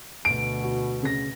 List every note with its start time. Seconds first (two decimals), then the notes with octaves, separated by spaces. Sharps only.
0.25 D2 B2 D7
0.64 F#4
1.03 C#3 A#6